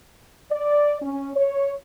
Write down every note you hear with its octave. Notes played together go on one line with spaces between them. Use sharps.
D5
C#4
C#5